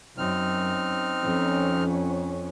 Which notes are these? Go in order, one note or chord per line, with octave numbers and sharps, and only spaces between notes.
F#2 C4 D#4 F6
F2 C#4